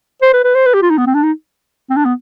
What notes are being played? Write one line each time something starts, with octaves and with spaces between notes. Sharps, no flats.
C5
B4
B4
C5
B4
G4
F4
D#4
B3
C4
D4
D#4
C4
D4
B3